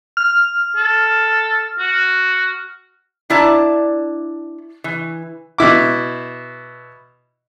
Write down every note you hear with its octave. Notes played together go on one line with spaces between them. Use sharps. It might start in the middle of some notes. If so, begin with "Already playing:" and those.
F6
A4
F#4
D4 E4 D5 A5 A#5
E3
B2 E4 D6